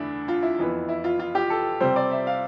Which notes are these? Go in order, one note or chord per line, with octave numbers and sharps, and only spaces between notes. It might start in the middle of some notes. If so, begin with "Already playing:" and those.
Already playing: E2 D3 A3 D4 E4
F4
E4
F2 E3 B3
E4
F4
F4
G4
A4
C3 G3 C4 C5
D5
E5
F5